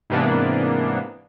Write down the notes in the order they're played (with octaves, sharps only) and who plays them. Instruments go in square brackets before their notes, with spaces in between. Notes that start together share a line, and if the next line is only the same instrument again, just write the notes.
[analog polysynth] G#2 C3 E3 A#3 B3 D4